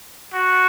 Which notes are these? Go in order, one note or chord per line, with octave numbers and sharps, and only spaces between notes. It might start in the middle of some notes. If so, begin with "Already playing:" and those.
F#4